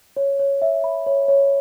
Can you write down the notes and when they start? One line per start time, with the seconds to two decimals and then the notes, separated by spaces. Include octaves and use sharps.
0.17 C#5
0.39 C#5
0.62 E5
0.84 B5
1.07 C#5
1.28 C#5